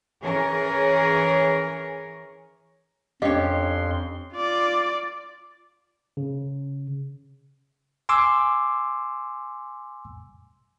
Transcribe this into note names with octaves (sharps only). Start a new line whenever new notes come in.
E3 C#4 G#4 A#4 C#5
F2 C#4 D4 G4 C#5 D#5 C6
F4 D5
C#3
G#5 C6 D6 E6